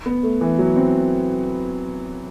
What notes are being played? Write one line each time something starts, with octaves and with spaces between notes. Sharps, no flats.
B3
A3
E3
F#3
C4